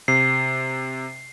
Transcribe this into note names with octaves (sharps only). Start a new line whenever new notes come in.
C3 C7